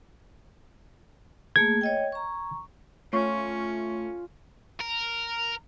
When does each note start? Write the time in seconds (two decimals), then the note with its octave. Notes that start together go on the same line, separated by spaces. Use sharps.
1.56 A3 A#3 G#4 G#6
1.81 C#5 D#5 G5
2.12 A#5 C#6
3.13 A3 C#4 F4 C#5 C#6
4.80 A#4